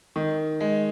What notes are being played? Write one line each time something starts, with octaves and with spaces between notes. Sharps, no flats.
D#3
G#3